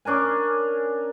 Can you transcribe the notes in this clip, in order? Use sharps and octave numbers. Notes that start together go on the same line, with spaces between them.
C#4 D4 A#4 G#5